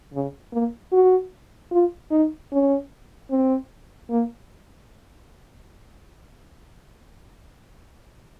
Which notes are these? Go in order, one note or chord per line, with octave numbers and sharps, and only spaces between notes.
C#3
A#3
F#4
F4
D#4
C#4
C4
A#3